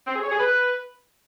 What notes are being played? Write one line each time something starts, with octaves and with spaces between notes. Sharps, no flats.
C4
G#4
C#5
G#4
B4